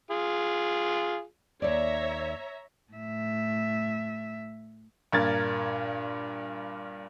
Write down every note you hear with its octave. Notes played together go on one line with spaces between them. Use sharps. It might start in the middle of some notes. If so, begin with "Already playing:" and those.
F4 G#4
D#2 C#5 D5 E5 A#5
A2 E5
G2 A#2 A#4 G#6 A6